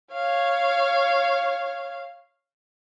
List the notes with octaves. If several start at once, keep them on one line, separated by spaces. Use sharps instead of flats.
C#5 F5